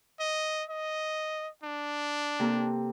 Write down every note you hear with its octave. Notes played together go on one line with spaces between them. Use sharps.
D#5
D#5
D4
C3 A#3 A4